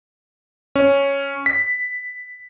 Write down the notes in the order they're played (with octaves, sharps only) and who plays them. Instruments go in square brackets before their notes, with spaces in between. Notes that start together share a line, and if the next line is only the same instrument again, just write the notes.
[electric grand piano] C#4
B6